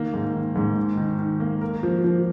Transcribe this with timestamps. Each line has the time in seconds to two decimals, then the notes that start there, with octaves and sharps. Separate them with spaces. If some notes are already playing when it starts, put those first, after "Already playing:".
Already playing: D#3 A#3
0.14 G#2
0.35 D#3
0.56 G#2
0.76 D#3
0.97 D#3
1.19 D#3
1.40 A#3
1.61 A#4
1.83 F3
2.04 F3